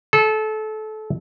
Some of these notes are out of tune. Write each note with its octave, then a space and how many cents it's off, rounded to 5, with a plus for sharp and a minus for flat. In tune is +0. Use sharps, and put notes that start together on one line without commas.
A4 -25